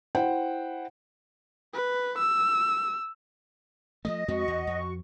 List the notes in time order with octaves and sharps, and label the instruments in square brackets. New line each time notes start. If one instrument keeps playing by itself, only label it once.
[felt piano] E4 C5 F#5 G5
[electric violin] B4
E6
[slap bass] F3 F#3 A3 [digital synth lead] D#5
[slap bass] F2 G#3 C4 [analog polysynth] F#4 C#6
[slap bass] E2
F2